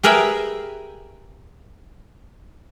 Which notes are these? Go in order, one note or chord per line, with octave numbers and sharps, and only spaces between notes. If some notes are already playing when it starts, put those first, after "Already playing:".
G4 G#4 A#4 B4 E5 G5